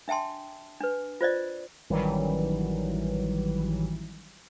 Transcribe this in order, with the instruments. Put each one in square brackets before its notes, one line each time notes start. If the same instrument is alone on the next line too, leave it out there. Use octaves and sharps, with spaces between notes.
[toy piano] D4 E5 G5 A5 C6
D4 B4
F4 C5 D5 D#5
[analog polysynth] A1 D#3 E3 F#3 G3